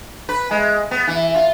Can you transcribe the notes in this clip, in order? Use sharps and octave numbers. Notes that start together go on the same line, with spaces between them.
B4
G#3
B3
E3
F4